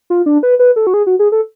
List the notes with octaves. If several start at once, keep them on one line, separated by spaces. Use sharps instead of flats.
F4
D4
B4
B4
A4
F#4
G#4
F#4
G#4
A4